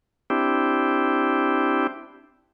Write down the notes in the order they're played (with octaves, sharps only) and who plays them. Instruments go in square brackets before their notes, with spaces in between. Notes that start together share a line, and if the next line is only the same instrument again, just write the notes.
[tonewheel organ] C4 D4 E4 G4